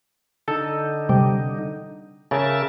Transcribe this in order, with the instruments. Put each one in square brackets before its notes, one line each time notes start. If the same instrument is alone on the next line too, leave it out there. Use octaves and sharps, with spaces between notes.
[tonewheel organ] D3 D#4 [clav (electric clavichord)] A4
[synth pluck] C3 G3
[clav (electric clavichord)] C#3 [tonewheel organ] A#4 E5 A5